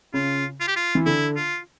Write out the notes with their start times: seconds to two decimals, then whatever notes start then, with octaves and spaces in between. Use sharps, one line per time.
0.14 C#3 F4
0.60 F4
0.67 G4
0.76 F4
0.95 E3
1.06 D3 E4
1.36 F4